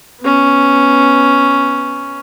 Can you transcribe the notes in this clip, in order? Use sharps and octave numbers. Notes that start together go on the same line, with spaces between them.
B3 C#4